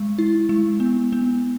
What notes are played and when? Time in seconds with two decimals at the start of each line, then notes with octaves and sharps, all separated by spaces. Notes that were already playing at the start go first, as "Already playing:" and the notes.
Already playing: G#3
0.19 E4
0.49 G#3
0.80 B3
1.13 B3